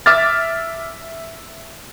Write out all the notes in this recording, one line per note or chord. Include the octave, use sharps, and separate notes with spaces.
E5 D6 F6 A6